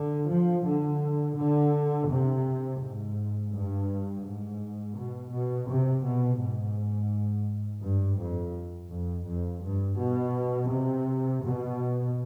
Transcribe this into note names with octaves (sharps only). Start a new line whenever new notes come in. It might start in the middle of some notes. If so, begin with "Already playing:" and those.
Already playing: D3
F3
D3
D3
C3
G#2
G2
G#2
B2
B2
C3
B2
G#2
G2
F2
F2
F2
G2
B2
C3
B2